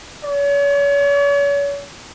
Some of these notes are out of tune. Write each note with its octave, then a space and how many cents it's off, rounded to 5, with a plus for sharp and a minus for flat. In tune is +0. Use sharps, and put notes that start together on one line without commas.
C#5 +40